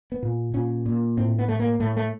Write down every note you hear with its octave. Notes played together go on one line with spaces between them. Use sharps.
B3
A#2
A#2 C#4
A#2
A2 C4
B3
A2 A3
A#3
A2 A3
A3